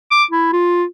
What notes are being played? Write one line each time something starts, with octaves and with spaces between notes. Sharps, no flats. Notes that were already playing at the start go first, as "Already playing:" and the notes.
D6
E4
F4